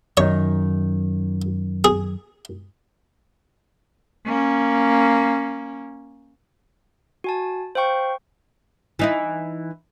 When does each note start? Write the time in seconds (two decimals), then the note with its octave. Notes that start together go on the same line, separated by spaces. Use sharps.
0.17 F#2 D#3 D#4 C#5
1.84 G#4
4.25 A#3 C#4
7.24 F#4 G#5 A5
7.75 C5 F5 G5 C#6
8.99 E3 D#4 E4